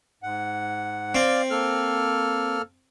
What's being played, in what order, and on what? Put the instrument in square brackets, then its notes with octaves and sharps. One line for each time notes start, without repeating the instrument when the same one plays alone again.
[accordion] G#2 F#5
[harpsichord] C4 [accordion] D5 F5
[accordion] A#3 A4 F6